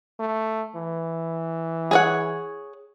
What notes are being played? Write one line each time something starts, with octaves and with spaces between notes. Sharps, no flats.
A3
E3
G#4 C#5 F#5